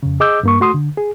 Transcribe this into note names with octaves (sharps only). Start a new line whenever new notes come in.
F2 C#3
G#4 D#5 D6 E6 G6
G2 A#3 C#6
A3 F#4 C6 D#6
D3
G#4